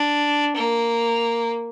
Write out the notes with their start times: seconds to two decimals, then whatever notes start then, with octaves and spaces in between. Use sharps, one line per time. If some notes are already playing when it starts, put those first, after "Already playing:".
Already playing: D4
0.56 A#3